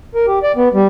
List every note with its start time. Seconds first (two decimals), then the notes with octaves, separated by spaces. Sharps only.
0.15 A#4
0.27 G4
0.43 D5
0.56 B3
0.74 G3